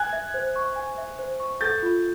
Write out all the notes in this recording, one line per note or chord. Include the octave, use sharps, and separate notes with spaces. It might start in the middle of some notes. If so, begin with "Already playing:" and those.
Already playing: G#5 F#6 G#6
E5
C5
C#6
G#5
E5
C5
C#6
A4 G6 A6
F4